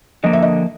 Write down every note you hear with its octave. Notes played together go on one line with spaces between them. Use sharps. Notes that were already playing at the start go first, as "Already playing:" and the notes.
D3 F3 A#3 D#5
E5
D#5